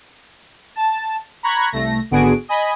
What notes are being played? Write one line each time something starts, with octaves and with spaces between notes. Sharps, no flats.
A5
A#5 B5 C#6 F#6 G#6
C2 A3 A#6
G#1 D3 B3 F#4 G#4 D7
D#5 G#5 B5